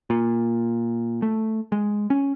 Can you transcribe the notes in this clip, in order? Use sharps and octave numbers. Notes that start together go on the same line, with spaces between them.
A#2
A3
G#3
C#4